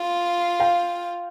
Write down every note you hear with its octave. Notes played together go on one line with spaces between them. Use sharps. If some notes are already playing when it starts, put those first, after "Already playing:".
Already playing: F4
F5 G5